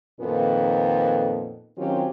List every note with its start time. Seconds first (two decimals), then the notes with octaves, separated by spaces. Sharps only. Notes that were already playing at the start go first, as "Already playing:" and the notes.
0.20 F2 A#2 D#3 B3 D#4 A4
1.77 D#3 F#3 C4 C#4 F4 G4